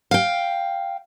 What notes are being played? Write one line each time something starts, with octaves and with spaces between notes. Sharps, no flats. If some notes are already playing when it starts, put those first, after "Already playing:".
F5 G5